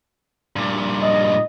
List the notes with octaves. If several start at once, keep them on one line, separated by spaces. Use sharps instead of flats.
G2 A#2
D#5